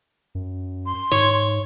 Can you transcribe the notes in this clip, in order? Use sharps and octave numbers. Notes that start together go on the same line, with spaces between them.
F#2
C6
G#2 C#5